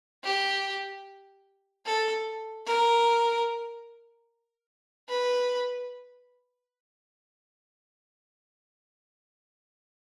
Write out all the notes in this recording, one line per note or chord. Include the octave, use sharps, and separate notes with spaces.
G4
A4
A#4
B4